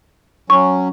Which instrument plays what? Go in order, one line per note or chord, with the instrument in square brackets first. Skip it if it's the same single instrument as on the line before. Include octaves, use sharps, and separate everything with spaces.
[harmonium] F#3 C#4 [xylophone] C#6